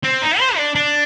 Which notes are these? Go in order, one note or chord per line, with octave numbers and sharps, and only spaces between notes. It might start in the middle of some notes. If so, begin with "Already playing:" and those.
C4
D#4
C5
D4
D4